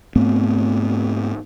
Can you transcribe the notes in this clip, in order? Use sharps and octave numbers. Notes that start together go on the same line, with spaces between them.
G#2 A3 B3 C4